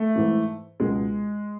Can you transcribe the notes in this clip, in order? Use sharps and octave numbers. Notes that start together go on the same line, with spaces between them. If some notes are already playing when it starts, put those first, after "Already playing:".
Already playing: A3
G#2 E3
C#2 B2 F#3 G#3